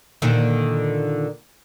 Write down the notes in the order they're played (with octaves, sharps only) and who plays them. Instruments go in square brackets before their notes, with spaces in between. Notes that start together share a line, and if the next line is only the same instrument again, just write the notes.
[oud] A#2 D3 D#3